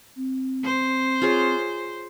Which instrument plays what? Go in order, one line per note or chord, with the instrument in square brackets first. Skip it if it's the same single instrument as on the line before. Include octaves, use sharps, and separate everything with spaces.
[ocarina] C4
[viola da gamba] C5
[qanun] F4 G#4 C#5